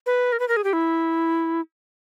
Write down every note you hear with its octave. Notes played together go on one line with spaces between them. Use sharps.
B4
A#4
B4
A#4
G#4
G4
E4